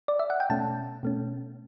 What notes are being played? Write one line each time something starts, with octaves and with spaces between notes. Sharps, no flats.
D5
E5
F#5
G5
B2 A3 C#4 A5
B2 A3 C#4